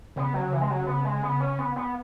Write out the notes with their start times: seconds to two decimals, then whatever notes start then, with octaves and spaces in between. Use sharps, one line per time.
0.16 C#3 B3
0.34 F#3
0.53 E3
0.62 G#3
0.70 F#3
0.87 B3
1.05 G#3
1.23 B3
1.41 C#4
1.59 B3
1.76 B3